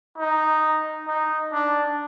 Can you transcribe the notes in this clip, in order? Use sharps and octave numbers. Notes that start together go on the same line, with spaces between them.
D#4
D#4
D4